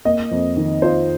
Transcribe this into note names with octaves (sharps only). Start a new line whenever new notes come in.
A#3 D#5
F2
D#3
F4 C5